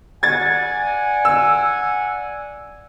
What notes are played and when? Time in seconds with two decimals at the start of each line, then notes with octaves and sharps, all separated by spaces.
0.23 D5 F#5 G#5 G#6 A6
1.25 E6